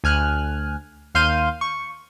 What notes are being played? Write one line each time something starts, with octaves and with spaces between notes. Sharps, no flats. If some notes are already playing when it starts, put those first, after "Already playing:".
D2 G#5 F6 F#6
D#2 F5 C6 F6 G6 D#7
C#6